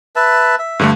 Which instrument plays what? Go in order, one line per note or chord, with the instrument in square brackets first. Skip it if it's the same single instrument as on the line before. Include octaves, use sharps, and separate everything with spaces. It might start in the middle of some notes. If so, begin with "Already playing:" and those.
[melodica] B4 E5 A5
E5
[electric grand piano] G2 D3 A3